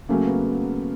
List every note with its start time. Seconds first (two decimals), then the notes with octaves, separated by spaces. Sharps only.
0.09 C#3 F#3 A3 A#3 C#4
0.27 B3